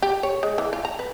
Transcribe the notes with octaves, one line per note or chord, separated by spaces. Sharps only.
G4
C#5
G#3
E3
F4
A#5
B4